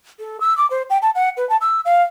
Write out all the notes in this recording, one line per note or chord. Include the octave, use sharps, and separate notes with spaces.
A4
E6
D6
C5
G5
A5
F#5
B4
A5
E6
F5